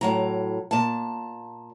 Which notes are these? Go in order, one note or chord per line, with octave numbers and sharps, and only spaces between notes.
A2 F#3 A#5
A#2 A5